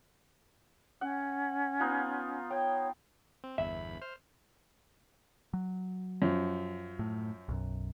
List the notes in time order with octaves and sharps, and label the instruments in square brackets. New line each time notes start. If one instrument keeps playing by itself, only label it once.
[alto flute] C#4 [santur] F#5
[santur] B3 D#4 F4
[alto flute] C#5 [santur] G5
[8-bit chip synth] C4
[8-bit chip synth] G1 E2 B5 [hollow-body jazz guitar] E5
[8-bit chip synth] C5 F6
[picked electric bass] F#3
[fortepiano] F#2 F3
[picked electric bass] A2
B1 F#2